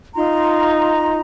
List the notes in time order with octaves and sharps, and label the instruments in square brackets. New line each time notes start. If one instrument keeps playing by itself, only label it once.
[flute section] D#4 F4 A#5 C6